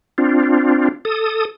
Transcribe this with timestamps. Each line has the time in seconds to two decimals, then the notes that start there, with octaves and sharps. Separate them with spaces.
0.18 C4 D4 F4
1.05 A4 D#6